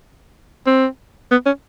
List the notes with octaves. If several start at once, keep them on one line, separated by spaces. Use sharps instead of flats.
C4
B3
C#4